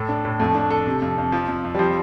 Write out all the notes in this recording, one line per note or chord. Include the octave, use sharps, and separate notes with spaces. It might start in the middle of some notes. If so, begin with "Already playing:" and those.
Already playing: A2 A4
D4
A2
F2 A3
D4
A4
C3
F2
F2
F2 F3
F2
F2
G3
F3 C4